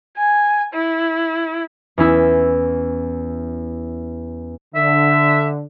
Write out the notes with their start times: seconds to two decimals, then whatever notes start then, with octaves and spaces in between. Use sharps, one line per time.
0.17 G#5
0.74 E4
1.98 E2 C#4 E4 E6
4.75 D3 E5